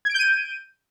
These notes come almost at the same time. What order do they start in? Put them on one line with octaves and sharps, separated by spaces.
G#6 D7 G6 D#7